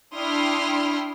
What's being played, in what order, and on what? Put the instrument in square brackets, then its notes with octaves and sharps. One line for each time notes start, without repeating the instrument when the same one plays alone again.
[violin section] D4 E4 G5 C6 D#6 F6